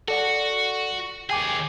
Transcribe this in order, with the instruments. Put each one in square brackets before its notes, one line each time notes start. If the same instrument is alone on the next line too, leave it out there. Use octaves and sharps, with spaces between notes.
[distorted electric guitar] F#4 [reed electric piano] A4 D5 F#5
[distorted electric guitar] D#2 G#4 [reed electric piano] G5 G#5 D6